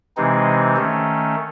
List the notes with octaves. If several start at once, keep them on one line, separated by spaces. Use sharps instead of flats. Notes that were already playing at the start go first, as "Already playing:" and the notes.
C3 E3 G#3 C4 D#4
D#3 A3 C#4